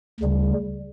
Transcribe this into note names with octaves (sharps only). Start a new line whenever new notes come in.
D2 C#3 G3